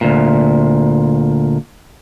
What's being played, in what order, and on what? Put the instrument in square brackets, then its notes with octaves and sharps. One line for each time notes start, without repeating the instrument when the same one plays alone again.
[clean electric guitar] D2 A#2